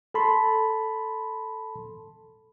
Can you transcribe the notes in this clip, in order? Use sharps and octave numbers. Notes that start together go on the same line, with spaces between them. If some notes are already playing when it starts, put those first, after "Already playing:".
A4 A5 B5 C6